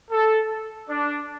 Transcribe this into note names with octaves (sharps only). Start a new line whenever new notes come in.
A4
D4